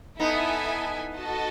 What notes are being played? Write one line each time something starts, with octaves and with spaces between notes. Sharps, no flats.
B3 D#4 E4 A4 E5 G#5
F#4 A4 D#5 A5